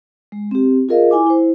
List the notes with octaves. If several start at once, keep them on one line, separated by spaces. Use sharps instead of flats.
G#3
C4 G4
F4 G#4 A#4 D#5 F5
E4 G#5 D6
E4 C5